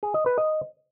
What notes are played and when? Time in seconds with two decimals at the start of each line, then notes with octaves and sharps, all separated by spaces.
0.03 G#4
0.14 D#5
0.26 B4
0.38 D#5